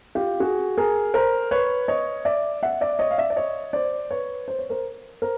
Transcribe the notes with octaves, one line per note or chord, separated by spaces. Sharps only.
F4 G4
F#4 G#4
G#4 A#4
A#4 C5
B4 C#5
C#5 D#5
D5 E5
E5 F#5
D5 E5
C#5 D#5
F5
D5 E5
D5
C#5 D#5
C5 D5
B4 C#5
C5
C#5
A#4 C5
A#4 C5